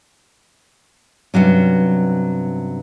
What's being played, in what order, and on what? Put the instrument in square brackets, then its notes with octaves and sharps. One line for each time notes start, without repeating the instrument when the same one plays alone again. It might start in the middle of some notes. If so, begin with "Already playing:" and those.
[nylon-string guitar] G2 C3 F#3 C#4